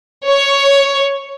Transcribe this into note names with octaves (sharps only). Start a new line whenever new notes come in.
C#5